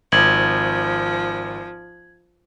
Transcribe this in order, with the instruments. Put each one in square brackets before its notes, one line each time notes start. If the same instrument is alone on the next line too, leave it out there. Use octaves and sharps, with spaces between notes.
[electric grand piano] G#1 [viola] F3 [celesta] G#6 F#7